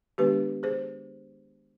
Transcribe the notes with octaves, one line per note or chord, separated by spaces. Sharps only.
D#3 G#3 B3 D4 G4 B4
G#4 C5